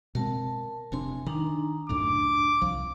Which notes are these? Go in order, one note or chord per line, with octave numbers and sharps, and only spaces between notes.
B2 G#3 C4 A#4 A5
F1 C3 D4 G#5 C6
D#3 D4 D#4 A#5
C#2 F#2 A2 D4 D6
C2 F3 F5